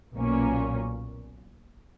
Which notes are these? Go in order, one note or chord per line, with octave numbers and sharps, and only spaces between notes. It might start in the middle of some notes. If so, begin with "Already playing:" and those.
B1 A#2 A#3 C#4